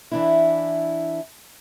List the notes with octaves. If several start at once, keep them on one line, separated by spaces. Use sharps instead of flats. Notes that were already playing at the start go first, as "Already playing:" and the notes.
E3 D4 E4